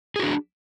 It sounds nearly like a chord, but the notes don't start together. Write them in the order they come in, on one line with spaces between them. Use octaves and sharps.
G#4 F#4 D4